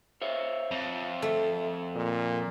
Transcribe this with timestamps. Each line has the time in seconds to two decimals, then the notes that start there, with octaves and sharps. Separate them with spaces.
0.22 C5 C#5 E5
0.71 F2
1.22 A3
1.95 A#2